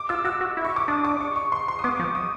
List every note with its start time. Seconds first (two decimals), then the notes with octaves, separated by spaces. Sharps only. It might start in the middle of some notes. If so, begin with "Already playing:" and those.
Already playing: D6
0.09 F4 E6
0.25 F#4 E6
0.41 F#4
0.57 E4
0.65 C#6
0.76 D6
0.88 D4 D#6
1.05 D6
1.21 C#6
1.36 C#6
1.52 C6
1.68 C6
1.79 D#6
1.84 B3 D6
1.99 F3 C#6
2.15 D#6